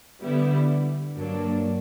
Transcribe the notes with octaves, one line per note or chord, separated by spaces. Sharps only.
D3 G3 B3 E4
G2 F#3 A#3 D4